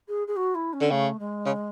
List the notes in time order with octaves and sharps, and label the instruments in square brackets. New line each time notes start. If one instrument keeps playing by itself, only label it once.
[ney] G#4
G#4
F#4
E4
C#4
[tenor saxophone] D3
[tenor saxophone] C#3 [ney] A3
[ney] G#3
[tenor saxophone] C#3